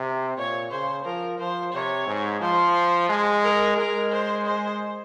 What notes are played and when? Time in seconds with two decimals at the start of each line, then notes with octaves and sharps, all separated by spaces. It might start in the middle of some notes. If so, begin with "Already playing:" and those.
Already playing: C3
0.37 A#2 C#5
0.71 C#3 C5
1.05 F3 A#4
1.39 F3 C5
1.73 C3 C#5
2.07 G#2
2.41 F3 C5
3.09 G#3
3.44 A#4
3.77 G#3 A#4
4.12 C5
4.46 C5